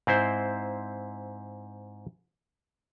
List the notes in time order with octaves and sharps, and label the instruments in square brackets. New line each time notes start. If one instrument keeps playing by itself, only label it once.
[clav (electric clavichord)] G#2 C4 E4 C5